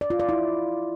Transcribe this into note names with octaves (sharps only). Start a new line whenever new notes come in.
D5
F4
D5
E4